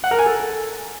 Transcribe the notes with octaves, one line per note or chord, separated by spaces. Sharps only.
F#5
A#4
G#5
A4